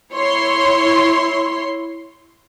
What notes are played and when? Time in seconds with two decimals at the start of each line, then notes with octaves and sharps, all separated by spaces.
0.13 E4 C#5 C6